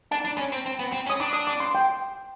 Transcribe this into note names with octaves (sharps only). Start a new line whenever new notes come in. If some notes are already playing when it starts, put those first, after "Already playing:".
D4 A5
D4
C#4
C4
C4
B3
C4
C#4
D#6
D4 D6
D#6
D6
C6
G5